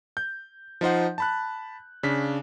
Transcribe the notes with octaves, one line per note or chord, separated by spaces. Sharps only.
G6
F3 D#4 C5 F#5
A5 B5 F#6
C#3 D4 B6